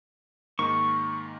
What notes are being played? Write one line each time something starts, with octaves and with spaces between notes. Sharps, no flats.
G#2 D#3 A#3 C#6